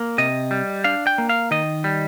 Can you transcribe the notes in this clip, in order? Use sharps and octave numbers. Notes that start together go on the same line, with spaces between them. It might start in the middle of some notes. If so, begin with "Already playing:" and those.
Already playing: A#3
C3 D#5
G3
D4 F5
G5
A#3
F5
D#3 D#5
G3